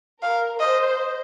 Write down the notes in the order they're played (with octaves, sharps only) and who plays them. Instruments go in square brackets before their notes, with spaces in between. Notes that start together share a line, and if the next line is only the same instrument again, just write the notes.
[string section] A#4 [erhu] F5
[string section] C5 [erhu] D#5